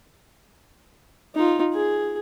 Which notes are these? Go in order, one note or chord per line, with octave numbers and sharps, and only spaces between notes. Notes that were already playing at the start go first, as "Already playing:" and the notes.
D#4 F4
G#4